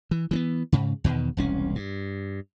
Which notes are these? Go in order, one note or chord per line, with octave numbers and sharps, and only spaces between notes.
E3
E3 A#3 B3
G#2 C#3
E2 B2 D#3
E1 C2 C#4
G2